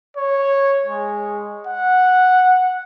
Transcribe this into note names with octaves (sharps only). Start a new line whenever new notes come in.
C#5
G#3
F#5